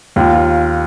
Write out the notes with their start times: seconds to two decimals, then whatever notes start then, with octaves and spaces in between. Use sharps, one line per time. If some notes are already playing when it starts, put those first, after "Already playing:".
0.16 D#2 F4
0.33 F4